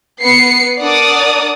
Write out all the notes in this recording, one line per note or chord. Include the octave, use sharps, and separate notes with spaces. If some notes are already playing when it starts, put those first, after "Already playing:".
B3 C7 C#7
D4 A#4 D5 F#5 D#6